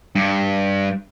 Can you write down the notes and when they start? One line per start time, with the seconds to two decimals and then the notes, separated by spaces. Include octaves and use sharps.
0.15 G2